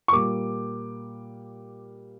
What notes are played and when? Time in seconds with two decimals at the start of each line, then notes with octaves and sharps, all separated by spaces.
0.08 C#6
0.12 A#2 G3 A#3 D6